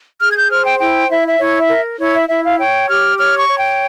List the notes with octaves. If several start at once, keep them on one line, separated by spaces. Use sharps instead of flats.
G#4 F6
G#6
G6
C5 F6
G5
E4 G5
E4 E5
E5
E4 C#5
E5
A#4
E4 C#5
E5
E4 E5
F5
C#5 G5
G4 F6
C#5 F6
C#6
C#5
G5